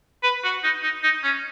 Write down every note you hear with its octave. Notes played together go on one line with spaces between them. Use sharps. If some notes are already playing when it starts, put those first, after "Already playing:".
B4
F#4
D#4
D#4
D#4
C#4